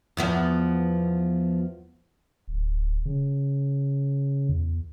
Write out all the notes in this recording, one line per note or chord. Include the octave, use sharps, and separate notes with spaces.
E2 F3 B3
D1
C#3
E2